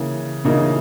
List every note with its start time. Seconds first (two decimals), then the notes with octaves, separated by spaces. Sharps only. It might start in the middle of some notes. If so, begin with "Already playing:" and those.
Already playing: C#3 E3 A#3
0.45 C#3 E3 A#3 D#4